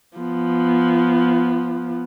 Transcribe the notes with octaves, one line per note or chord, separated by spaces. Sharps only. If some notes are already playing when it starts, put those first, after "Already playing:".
F3 B3